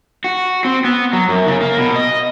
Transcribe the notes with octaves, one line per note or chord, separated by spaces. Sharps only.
F#4
C4
B3
F#3
F#2
C#3
A#3
B2
D#5